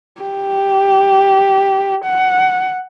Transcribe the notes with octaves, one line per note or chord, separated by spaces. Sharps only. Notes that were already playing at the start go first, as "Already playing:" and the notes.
G4
F#5